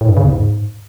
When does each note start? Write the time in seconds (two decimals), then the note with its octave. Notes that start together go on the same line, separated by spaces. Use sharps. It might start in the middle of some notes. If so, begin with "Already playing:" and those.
0.01 A2
0.09 G2
0.17 C#3
0.25 E2
0.33 G#2